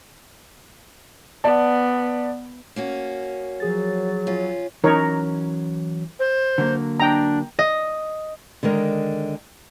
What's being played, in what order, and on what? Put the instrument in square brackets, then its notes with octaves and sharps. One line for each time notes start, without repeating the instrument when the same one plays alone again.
[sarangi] B3 [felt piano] D5 A5
[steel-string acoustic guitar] A#3 C#4 F#4
[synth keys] F3 G#4 A6 [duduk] F#3
[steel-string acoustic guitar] C#4 F4
[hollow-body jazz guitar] E3 F#3 C#4 [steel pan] D#4 A#4 C#5
[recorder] C5
[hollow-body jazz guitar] D3 F#3 A#3
[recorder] D4 [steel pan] G5 A#5
[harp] D#5
[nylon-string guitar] D3 D#3 G#3 A#4